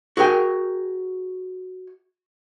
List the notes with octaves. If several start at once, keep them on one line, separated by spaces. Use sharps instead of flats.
F#4 G#4 A#4 G5 G#5